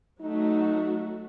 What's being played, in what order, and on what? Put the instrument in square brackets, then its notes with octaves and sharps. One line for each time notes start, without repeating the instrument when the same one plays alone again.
[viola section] F#3 A3 F#4 [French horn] D#4